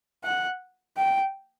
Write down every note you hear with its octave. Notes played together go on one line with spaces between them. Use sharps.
F#5
G5